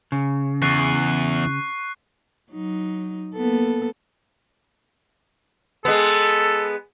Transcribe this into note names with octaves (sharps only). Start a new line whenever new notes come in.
C#3
E2 C#6 F#6 C7
F#3 D#4
A#3 B3 A4
G#3 B3 A4